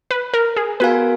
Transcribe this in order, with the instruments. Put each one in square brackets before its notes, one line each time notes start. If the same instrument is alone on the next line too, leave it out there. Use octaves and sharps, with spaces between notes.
[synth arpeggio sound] B4
A#4
G#4
[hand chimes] B3 F#4 A#4 F5 G#5 [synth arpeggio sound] B4